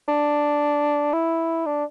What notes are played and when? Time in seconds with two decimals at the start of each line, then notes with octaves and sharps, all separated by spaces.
0.08 D4
1.13 E4
1.66 D4